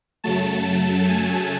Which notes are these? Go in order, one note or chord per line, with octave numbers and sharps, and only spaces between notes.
F#2 C#3 F#3 A3 A5
G#5